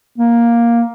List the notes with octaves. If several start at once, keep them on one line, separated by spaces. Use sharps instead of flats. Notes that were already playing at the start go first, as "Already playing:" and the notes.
A#3